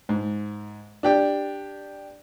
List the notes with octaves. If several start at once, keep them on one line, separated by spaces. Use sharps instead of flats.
G#2
D4 G4 G5